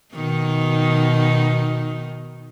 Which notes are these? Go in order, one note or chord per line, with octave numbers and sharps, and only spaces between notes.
B2 D#3 D#4